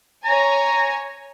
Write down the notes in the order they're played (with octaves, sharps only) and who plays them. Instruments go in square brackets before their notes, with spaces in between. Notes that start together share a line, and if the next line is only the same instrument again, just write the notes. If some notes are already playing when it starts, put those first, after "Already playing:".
[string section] C#5 G#5 [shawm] A#5